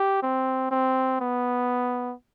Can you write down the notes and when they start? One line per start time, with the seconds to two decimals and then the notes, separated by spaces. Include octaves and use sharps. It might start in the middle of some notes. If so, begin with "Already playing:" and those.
Already playing: G4
0.23 C4
0.71 C4
1.21 B3